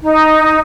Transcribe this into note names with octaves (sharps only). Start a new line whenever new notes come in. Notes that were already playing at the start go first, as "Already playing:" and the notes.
D#4